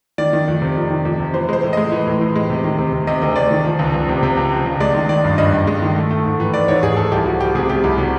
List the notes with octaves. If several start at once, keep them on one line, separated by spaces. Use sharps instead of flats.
D#3 D5
D#3
F2
C3
F2
D#3
F2
C3
E3 C5
G#3 C5
A2
G#3 D#5
E3
A2
A2
G#3
C3
D#3
C3
C3
C3 D#5
D2
D2 D5
D#3
F3
C#2
C#2
C3
C3
C#2
F3
C#2
G#3 D5
D#3
D#3 D5
G2
G2 D#5
G2
G#3
D#3
A3
A3
G#2
E3
G#2 D5
G#2 C#5
G#2 G#4
G#2 A4
C2 G4
F3 F#4
F3 G4
C3 G#4
C3 G4
C2
C3 F#4